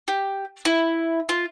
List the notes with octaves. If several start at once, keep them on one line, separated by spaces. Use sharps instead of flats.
G4
E4
F4